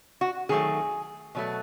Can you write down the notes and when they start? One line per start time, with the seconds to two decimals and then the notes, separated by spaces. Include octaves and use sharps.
0.21 F#4
0.49 D#3 F#3 A3 G#4
1.35 B2 F#3 A3